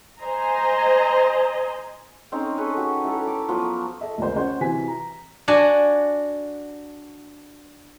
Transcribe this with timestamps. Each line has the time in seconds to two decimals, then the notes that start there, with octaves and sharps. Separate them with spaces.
0.21 C5 D#5 G#5 A#5
2.32 C4 C#4 D#4 A#4
2.57 G#4 A4 B4 C#5
2.77 F#4 G4
3.04 E4 G4 A4 A#4
3.27 D6
3.49 F3 F#3 B3
4.01 A4 D#5 E5
4.18 F1 C#2 A#4 C5
4.36 C#4 C5 F#5
4.61 C3 E3 F#3 G#5 B6
4.88 A#5
5.48 D4 F#4 G#5